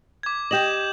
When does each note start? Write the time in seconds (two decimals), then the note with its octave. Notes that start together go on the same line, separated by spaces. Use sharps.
0.23 D6 G#6
0.51 G4 D#5 G6 E7 F#7